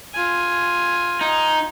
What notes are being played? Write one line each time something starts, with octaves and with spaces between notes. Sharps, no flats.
F4 G#5
D#4